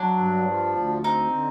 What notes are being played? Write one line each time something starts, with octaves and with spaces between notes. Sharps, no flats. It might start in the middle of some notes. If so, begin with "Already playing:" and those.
Already playing: F#3 D4
G2
F3
D2
C4 D#4
D3